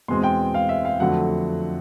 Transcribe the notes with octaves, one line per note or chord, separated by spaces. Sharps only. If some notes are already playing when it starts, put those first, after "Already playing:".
E2 B2 G#3 C4 C6
G5
F5
E5
F5
F2 D3 F#3 A3 F#5